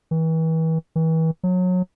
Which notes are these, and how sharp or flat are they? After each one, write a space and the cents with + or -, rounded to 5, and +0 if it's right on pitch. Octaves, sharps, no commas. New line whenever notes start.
E3 -35
E3 -35
F#3 -25